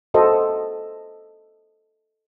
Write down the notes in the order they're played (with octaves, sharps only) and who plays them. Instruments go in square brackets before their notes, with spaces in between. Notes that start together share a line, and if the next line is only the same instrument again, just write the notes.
[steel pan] F#4 A4 C5 D#5